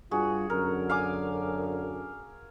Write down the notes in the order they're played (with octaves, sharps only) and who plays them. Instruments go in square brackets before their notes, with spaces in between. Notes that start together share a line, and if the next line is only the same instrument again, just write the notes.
[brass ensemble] G2 F4 [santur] F#4 G#4
[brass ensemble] F#2 D3 [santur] A#4
[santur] F5 G#5 D6